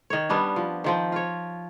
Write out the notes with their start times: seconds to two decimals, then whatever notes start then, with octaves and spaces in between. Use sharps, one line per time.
0.10 D#3 C#5
0.29 G3 B3 C#4 D4
0.56 F3
0.84 D#3 F3 C4
1.12 F4 C#5